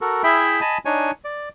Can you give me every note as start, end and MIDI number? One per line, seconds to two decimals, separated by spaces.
0.01 0.22 66
0.01 0.22 69
0.01 0.22 70
0.24 0.60 64
0.24 0.60 68
0.24 0.60 76
0.24 0.60 79
0.24 0.60 83
0.61 0.78 75
0.61 0.78 80
0.61 0.78 81
0.61 0.78 83
0.85 1.11 62
0.85 1.11 63
0.85 1.11 73
0.85 1.11 80
1.25 1.49 74